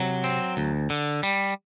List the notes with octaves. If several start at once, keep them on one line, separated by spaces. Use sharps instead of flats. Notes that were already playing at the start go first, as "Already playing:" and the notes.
Already playing: C3 F#3
C4
D2
D3
G3